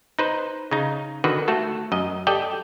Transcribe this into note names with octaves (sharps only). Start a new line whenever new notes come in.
D#4 B4 C5
C#3 D#4
D3 D#3 F#4 B4
A3 F#4 A4
F#2 D#5
G4 A4 D5 D#5 G5